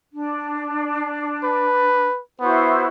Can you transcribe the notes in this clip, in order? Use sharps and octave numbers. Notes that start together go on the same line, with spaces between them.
D4
B4
B3 E4 F#4 C5